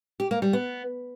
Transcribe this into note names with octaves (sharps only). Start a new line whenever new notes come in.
G4
A#3
G3
B3